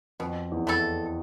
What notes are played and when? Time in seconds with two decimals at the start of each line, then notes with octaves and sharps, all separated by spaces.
0.20 F2 B2
0.52 E2
0.67 A3 E4 A4